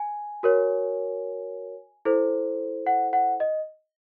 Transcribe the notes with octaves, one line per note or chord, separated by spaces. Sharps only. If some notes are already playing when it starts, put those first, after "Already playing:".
Already playing: G#5
F#4 A#4 C#5
E4 A4 C5
F#5
F#5
D#5